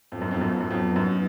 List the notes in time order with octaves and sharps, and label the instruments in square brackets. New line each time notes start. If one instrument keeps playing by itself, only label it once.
[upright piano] F2 [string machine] F#3 B3 D#4
[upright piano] F#2
F2
F#2
F2
F#2
F2
F#2